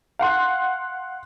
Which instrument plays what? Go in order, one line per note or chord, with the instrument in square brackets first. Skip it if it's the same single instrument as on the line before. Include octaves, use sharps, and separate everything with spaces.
[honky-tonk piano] F5 F#5 C6 F#6